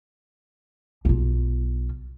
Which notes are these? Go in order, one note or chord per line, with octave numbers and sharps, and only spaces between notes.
B1 F4